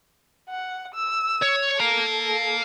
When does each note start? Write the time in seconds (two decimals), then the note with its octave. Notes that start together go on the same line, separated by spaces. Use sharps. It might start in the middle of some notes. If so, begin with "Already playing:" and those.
0.50 F#5
0.95 E6
1.42 C#5
1.80 A4 F5 A#5